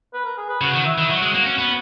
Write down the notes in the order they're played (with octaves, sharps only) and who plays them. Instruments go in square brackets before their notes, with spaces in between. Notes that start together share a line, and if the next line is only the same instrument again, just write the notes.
[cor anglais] B4
A#4
G#4
B4
[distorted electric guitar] C#3 [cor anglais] F#4
[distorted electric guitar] D#3
[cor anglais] E4
[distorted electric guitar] D#3
[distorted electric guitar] F#3 [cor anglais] F#4
[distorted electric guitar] G#3
A#3
C#4
B3